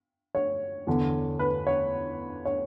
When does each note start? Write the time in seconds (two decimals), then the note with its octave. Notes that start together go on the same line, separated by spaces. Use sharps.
0.35 C#5
0.87 E2 D3
1.39 B4
1.67 C#5
2.45 C#5